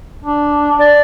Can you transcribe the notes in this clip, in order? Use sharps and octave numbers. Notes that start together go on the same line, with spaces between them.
D4
D5